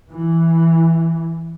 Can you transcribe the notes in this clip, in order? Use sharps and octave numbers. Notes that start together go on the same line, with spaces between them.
E3